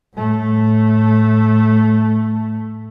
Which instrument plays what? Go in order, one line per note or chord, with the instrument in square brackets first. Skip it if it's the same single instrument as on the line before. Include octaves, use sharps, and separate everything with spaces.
[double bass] A2 A3